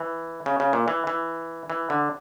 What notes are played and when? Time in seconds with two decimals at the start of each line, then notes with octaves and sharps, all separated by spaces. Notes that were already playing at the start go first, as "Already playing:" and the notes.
Already playing: E3
0.46 C#3
0.60 C#3
0.73 A#2
0.88 E3
1.07 E3
1.70 E3
1.90 D3